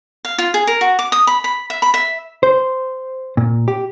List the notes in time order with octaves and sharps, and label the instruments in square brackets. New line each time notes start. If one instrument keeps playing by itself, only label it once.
[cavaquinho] F5
F4
G#4
A#4
F#4
D6
D#6
B5
B5
E5
B5
E5
[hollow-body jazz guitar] C5
A#2
G4